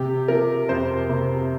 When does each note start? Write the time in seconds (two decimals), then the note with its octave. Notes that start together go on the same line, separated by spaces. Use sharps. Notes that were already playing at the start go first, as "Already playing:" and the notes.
Already playing: C3 G4
0.28 F3 A#4
0.69 F2 C5
1.09 C3